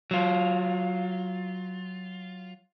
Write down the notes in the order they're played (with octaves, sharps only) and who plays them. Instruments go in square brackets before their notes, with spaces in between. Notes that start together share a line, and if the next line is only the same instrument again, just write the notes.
[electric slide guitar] F#3 F4